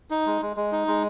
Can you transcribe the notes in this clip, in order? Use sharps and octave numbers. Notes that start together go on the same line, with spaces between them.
D#4
G#3
G#3
G#3
D#4
G#3